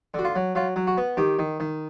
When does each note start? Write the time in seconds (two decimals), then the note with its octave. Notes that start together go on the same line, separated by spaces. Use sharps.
0.14 D3 F#4
0.24 F4
0.36 F#3
0.55 F#3 F4
0.76 F#3
0.87 F#4
0.97 B3
1.17 D#3 G4
1.39 D#3
1.60 D#3